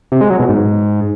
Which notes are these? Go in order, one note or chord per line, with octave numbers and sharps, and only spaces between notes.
C3
G#3
F#3
B2
G#2